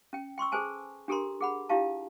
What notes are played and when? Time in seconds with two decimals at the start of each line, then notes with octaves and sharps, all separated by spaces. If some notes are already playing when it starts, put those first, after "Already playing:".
0.13 C#4 G5
0.38 G5 C6 C#6 E6
0.52 G#4 A4 B4 C5 G#5 A5
1.08 D4 G4 A4 A#4 A#5 C6
1.41 G#4 F#5 B5
1.69 D4 E4 F4 G4 F5 A5